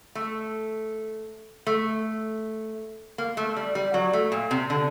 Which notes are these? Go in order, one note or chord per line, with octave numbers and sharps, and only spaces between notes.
A3
A3
A#3
A3
G3
G3
F#3
A3
A#2
C3
D3